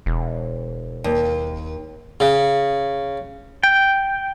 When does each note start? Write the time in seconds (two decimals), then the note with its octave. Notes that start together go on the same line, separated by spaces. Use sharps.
0.06 E1
1.04 D#2
2.20 C#3
3.63 G5